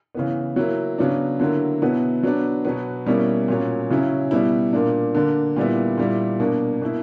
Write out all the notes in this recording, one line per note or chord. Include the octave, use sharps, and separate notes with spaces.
C#3 E3 B3
F#3 A#3 E4
C#3 F#3 B3 D4
D3 F#3 A#3 E4
B2 F#3 B3 E4
F#3 B3 D4
B2 F#3 B3
B2 G3 A#3 C#4 E4
A#2 F#3 C#4
C#3 F#3 C#4 E4
B2 G3 B3 E4
A#2 A#3 D4
D3 A#3 D4
A#2 G3 B3 E4
A#2 G3 A#3 E4
B2 A#3 D4
B2 A#3 E4